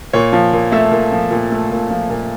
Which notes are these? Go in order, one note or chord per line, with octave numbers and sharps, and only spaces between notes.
A#2 C#5
F3
A#2
A3 E5
A#2
F3
A#2
A3
A#2
F3
A#2